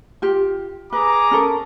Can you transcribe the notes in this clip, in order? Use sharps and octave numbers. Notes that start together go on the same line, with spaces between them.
F4 G4
G#4 B4 A#5 D6
C#4 A4 A#4